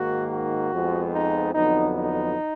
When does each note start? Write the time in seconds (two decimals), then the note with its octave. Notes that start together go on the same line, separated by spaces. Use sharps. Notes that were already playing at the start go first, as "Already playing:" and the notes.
Already playing: G#2 D#3 A#3 F#4
0.32 F#4
0.73 F2 F3 G#3 B3
1.13 D#4
1.54 F2 D3 F#3 B3 D#4
1.96 D#4